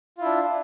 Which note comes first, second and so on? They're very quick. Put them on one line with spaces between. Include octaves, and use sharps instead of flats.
F4 E4 D4